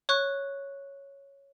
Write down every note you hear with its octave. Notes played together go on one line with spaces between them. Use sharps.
C#5 C#6 F#6